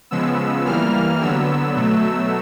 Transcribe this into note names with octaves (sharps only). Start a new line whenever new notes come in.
C#3 F3 G#3 B3 E6
E3 G3 A#3 F6
D3 F#3 B3 E6
B2 F#3 A3